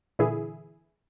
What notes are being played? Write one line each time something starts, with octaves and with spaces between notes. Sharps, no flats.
A#2 D3 E3 E4 G#4